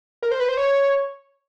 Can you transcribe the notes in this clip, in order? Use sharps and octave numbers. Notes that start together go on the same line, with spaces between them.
A#4
C5
B4
C5
C#5